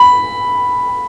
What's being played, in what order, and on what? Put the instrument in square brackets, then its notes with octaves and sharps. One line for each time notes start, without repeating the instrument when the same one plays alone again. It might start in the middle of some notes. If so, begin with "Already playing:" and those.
Already playing: [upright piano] B5